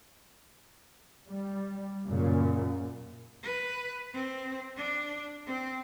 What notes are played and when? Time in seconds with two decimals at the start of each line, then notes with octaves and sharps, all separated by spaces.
1.29 G3
2.05 F#2 A#2 C#3
3.43 B4
4.14 C4
4.77 D4
5.47 C4